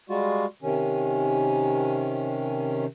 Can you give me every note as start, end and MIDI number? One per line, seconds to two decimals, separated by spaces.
0.09 0.46 55
0.09 0.46 56
0.09 0.46 65
0.09 0.46 66
0.62 2.86 48
0.62 2.86 51
0.62 2.86 61